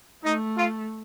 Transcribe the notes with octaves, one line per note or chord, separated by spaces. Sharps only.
A3 D#4
F4